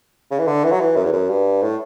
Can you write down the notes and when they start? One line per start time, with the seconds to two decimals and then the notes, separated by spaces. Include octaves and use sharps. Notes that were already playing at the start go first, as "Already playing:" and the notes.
0.31 C#3
0.39 E3
0.47 D3
0.64 E3
0.72 F#3
0.80 E3
0.96 F#2
1.05 E2
1.13 F#2
1.30 G2
1.62 A2